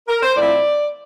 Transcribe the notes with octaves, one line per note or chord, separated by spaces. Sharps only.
A#4
C5
A2 F3 C4 E4 D5